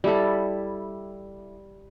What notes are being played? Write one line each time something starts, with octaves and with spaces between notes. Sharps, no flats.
G3 E4 A4